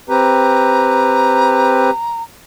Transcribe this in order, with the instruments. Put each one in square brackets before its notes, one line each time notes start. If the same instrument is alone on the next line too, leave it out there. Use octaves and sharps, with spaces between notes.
[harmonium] C4 G4 B4 [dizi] A#5